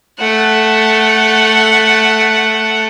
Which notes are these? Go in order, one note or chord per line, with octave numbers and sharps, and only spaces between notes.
A3 F#5